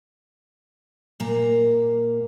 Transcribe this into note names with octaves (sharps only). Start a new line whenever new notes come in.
A#2 A#3 A#5